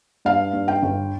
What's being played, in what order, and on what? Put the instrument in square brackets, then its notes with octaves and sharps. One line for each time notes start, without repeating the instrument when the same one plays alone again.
[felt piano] G2 F5
G2
G5
G1